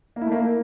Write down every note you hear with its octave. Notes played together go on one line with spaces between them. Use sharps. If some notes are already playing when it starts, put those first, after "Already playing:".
A#3
E4
A3
A#3